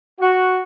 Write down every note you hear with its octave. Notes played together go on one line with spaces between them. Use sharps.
F#4